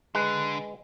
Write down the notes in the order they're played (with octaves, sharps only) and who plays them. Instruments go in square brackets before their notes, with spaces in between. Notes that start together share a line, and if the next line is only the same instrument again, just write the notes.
[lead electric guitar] D3 [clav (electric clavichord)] G#3 B4